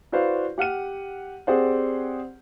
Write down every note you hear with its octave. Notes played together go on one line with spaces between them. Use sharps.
E4 F#4 B4 C5 D5 F5
G4 F#5 F6 D#7
C4 G4 G#4 C5 D5 F#5